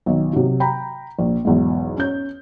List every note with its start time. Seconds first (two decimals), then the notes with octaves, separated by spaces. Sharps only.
0.06 B1 D#3
0.33 C3 F#3
0.60 G5 A#5 B5
1.19 A#1
1.45 B1 E2 G#2
1.97 C#4 G6